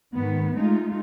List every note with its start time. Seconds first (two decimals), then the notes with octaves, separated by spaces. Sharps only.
0.13 G#2 D#3 B3
0.56 G#3 A3 D#4 F4